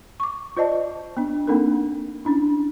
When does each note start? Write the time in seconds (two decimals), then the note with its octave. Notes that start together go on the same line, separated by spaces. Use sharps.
0.20 C#6 D6
0.57 F4 C5 D5 D#5 A5
1.17 B3 D4
1.47 A#3 C4 D4 D#4 A4 A#4
2.25 C#4 D4 E4